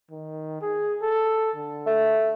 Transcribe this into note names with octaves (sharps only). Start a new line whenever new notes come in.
D#3
G#4
A4
D3
A3